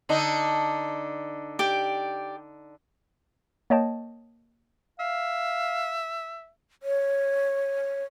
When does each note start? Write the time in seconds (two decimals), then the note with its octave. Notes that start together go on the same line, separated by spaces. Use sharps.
0.09 D3 D4 D#4
1.59 G4 D5
3.70 A#3 C#5 D#5 G5 A5
5.00 E5 F5
6.83 C#5